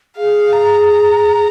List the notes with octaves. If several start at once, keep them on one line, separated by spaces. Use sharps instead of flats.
G#4 F5
A#5
A#5